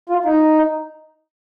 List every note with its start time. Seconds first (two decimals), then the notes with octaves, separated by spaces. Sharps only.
0.09 F4
0.25 D#4